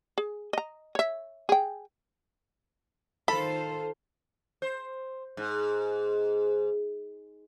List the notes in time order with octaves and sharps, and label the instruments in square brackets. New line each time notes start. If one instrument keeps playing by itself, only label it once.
[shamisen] G#4
D#5 A#5
C#5 E5
G#4 G5
[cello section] D#3 F4 C5 [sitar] A4 [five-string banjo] B5
[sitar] C5
G#2